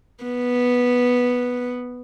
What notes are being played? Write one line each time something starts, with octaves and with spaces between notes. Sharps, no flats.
B3